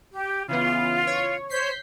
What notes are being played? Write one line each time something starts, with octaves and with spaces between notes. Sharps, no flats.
G4
C#3 E3 B3 F4
C#5
C5 C#5 G6 B6 C7